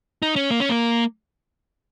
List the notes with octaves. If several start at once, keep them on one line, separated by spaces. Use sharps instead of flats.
D#4
C#4
A#3
C#4
A#3